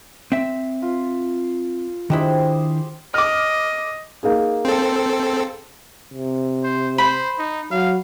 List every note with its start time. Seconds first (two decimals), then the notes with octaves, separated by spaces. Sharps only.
0.32 C4 E5
0.82 F4
2.10 D#3 D4 E4 G4 G#4 C5
3.14 D#5 D6 F6
4.23 A#3 D#4 G#4
4.65 C4 A4
6.14 C3
6.63 C5
6.98 C5 B5
7.39 D#4
7.71 F#3 F5